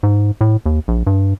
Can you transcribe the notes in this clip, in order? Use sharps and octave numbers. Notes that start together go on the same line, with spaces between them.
G#2
A2
D#2
A#1
G2